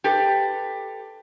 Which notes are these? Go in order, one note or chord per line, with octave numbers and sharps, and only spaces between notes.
G4 A4 B4